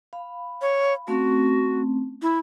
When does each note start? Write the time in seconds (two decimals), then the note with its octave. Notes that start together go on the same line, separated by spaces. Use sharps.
0.13 F5 B5
0.62 C#5
1.08 A3 C4 C#4 F#4
2.22 E4